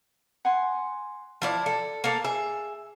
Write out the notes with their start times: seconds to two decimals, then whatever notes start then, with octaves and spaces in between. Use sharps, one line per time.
0.45 F#5 G#5 C6
1.42 F3 E4 D5 A5
1.66 A4
2.04 A#3 A4 F5 A5
2.24 G#4 E5